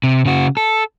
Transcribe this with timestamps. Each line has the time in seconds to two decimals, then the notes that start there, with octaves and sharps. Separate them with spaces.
0.04 C3
0.25 C#3 F#4
0.57 A4